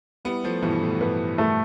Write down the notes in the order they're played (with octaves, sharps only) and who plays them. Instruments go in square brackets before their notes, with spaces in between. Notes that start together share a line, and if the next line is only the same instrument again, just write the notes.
[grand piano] G3 B3 [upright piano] E4
[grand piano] F3 A3
[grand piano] G2 B2 [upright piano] E3
[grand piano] A2
[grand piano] G2 [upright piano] B4
[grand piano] G2 B2 [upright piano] A3